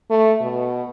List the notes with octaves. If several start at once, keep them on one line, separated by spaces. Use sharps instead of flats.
A3
B2